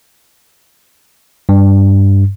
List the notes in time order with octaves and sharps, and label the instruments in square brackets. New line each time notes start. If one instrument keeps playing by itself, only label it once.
[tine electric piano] G2